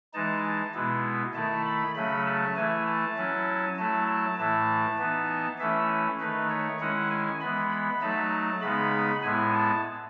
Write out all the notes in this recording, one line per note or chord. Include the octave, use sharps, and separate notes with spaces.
E3 G#3 D#4 A5
A5
B2 G#3 B3 E4
D#3 A3 E4 A5
B5
C#3 F#3 A3 C#4 B5
A5
E3 A3 E4 G#5
A5
F#3 C#4 E4
F#3 A3 E4 A5
A5
A2 E3 A3 E4 A5
E3 B3 D#4
E3 A3 C#4 E4 E5
D#3 A3 D#4 B4
C#5
D#3 G#3 C#4 E4 F#5
G#5
E3 G#3 B3 B5
B5
F#3 A3 D#4 A5
C#3 G#3 B3 D#4 B5
A2 G#3 B3 E4 G#5
A5